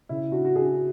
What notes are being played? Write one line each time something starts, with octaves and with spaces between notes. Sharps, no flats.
C#3 E4
D4 F#4
F#4
D4 G#4